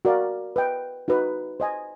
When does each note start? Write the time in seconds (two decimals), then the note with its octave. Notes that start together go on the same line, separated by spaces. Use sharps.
0.05 F#4 A#4 D5 F5
0.56 B4 D#5 G5
1.08 D#4 F#4 B4
1.60 C5 D#5 G#5